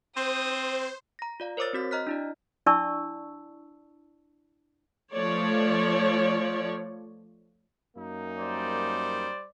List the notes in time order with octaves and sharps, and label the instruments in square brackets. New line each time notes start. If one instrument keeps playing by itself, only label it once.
[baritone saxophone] C4 [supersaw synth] C5 [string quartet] D#6
[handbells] A#5 A#6
F4 D5 F5
A#4 C5 C#5 D6 E6 A6
C4 F#4 B6
D#5 A#5 F6 F#6 B6
D4 E4 D5
[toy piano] D4 E4 D5 A5 C#6 E6
[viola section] F3 A3 C#5 D5
[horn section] F#2 A#3 D#4
[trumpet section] G3 C5 D5